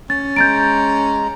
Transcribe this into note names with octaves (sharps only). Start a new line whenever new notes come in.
C#4 A6
G#3 A#5 G6 A6 D7